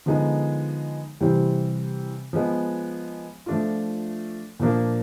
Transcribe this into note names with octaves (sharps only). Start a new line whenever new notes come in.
D3 F3 G#3 B3 D#4
C3 E3 G3 C4
F3 G#3 B3
F3 A3 D4 F4
A#2 F3 A#3 D4